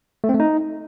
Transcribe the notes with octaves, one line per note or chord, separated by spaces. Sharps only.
A3
C4
A3
D#4